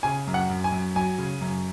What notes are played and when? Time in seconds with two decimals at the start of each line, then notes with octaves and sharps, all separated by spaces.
0.03 C#3 G#5
0.27 F#2
0.34 F#5
0.50 F#2
0.64 G#5
0.72 F#2
0.95 F#3 G#5
1.18 C#3
1.41 F#2